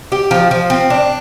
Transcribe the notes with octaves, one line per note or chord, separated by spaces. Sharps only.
G4
F3
F3
C4
D4